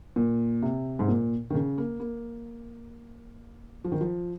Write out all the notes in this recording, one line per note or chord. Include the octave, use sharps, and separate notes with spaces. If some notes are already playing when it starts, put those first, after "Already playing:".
A#2
C3
G#2
A#2
D#3
C#3
A#3
A#3
F3
D#3
F3